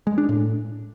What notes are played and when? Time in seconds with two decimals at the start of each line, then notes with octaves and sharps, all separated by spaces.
0.07 G#3
0.18 D4
0.29 A2